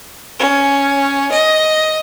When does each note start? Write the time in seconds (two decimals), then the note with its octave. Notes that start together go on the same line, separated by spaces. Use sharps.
0.39 C#4
1.32 D#5